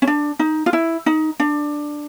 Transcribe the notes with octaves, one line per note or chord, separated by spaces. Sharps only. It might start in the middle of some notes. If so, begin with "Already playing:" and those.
C#4
D4
D#4
F4
E4
D#4
D4